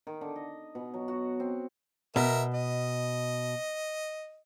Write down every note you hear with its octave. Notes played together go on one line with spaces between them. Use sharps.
D#3
D3
D#5
B2
F#3
F#4
C4
B2 A#4 E5
D#5